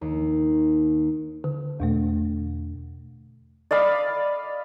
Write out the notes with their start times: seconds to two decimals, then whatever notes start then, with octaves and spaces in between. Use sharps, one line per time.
0.01 D#2
1.44 D3
1.80 E2 B2 A3
3.71 D5 D#5 F5 B5